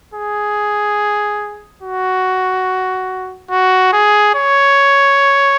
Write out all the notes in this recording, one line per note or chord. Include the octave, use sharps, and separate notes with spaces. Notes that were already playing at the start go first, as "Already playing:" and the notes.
G#4
F#4
F#4
G#4
C#5